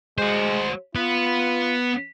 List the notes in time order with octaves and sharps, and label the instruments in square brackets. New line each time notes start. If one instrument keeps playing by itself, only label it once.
[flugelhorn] G#3 [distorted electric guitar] F#4 C5
[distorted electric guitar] B3 B4 [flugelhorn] F4